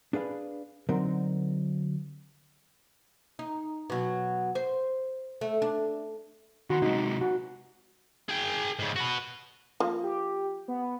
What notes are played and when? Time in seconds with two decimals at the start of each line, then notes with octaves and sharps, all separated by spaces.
0.13 D4 G#4 B4 F5
0.89 D3 F#3 C4 D#4 A#4
3.39 D#4
3.90 B2 F#3
4.55 C5
5.41 A3
5.62 D4
6.70 D#3 F#4 C6
6.82 C3 G#3 D#4
7.21 F#4
8.29 G#4 G5
8.79 G#2 C#3
8.96 F#4 B4
9.80 F3 A#3
10.03 G4
10.68 B3